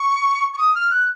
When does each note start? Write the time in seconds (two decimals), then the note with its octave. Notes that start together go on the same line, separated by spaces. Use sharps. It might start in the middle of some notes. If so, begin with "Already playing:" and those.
Already playing: C#6
0.54 C#6
0.58 D#6
0.75 F6
0.91 F#6